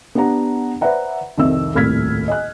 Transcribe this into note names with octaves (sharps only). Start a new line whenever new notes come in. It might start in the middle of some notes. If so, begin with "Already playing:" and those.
B3 D4 G4 F#5 A#5
B4 C5 D5 E5 F#5 A#5
C2 F2 D#3 E5 E6
D#1 C2 A2 F6 G#6 B6
D#5 G#5 F#6